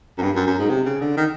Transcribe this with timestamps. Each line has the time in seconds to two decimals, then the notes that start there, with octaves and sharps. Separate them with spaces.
0.18 F#2
0.22 G2
0.35 F#2
0.46 F#2
0.59 G#2
0.69 C3
0.86 C#3
1.01 D3
1.17 D#3